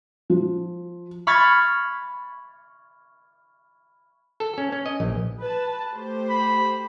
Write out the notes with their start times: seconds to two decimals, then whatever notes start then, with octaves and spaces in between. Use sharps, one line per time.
0.30 F3
1.27 B5 C#6 F6 G#6 A6
4.40 A4
4.58 C#4
4.72 C#4
4.86 D#5
5.00 A#1
5.40 B4 A5
5.93 A3 G4 C5
6.29 B5